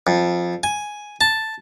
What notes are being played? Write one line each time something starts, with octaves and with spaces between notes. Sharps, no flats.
F2
G#5
A5